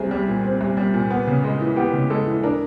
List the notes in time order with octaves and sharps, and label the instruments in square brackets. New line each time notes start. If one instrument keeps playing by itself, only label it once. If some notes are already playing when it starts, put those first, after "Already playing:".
Already playing: [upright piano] C2 C4 [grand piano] G#4
[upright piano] G3
A#2
C4
C2
G3
A#2
B3
C#3
G#3
E3
[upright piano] B3 [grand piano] G4
[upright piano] C#3
[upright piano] G#3 [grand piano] A4
[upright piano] E3
[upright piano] D4 [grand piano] A#4